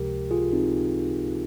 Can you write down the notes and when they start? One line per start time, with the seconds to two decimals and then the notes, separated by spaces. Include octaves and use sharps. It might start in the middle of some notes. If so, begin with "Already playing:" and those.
Already playing: C#2 C3 F3 G#3 G4 A#4
0.31 F4 G#4
0.52 C4 D#4